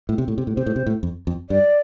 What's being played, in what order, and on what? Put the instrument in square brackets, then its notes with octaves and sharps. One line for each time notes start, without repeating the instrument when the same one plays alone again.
[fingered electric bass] A2
C3
A2
C3
A2
[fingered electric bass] C3 [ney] C5
[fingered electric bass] A2
C3
A2
F2
F2
[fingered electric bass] G2 [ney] D5